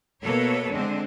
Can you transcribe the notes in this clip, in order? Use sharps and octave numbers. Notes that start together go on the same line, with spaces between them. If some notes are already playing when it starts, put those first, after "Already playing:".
B2 A#3 A4 B4 C#5
D3 G#3 C4 D4